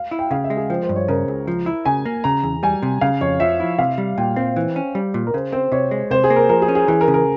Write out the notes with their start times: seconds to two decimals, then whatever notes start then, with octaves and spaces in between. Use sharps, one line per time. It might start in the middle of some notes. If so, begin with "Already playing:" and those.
Already playing: F5
0.11 E4
0.19 G5
0.31 C#3 F5
0.44 E5
0.50 G#3
0.57 G#4
0.70 F3 C5
0.83 C5
0.89 G2
0.96 C#5
1.08 C#3 A#4
1.28 C#2
1.48 F3
1.66 E4
1.85 C#3 G#5
2.06 A#3
2.24 C#3 A#5
2.43 E2
2.63 G3 G#5
2.82 C3
3.01 C#3 F5
3.21 F2 C#5
3.40 F3 E5
3.60 E4
3.78 C3 F5
3.98 G3
4.18 A#2 G5
4.36 C4 C5
4.56 E3
4.76 C#4
4.95 G3
5.14 A#2
5.27 A#4
5.34 C#3 C5
5.53 C4 C5
5.72 C3 C#5
5.91 G#3
6.11 C3 C5
6.24 G#4
6.30 A#3
6.36 A#4
6.49 F3 A#4
6.62 G#4
6.68 C#4
6.75 G#4
6.88 E3 G#4
7.01 A#4
7.08 C#3
7.14 A#4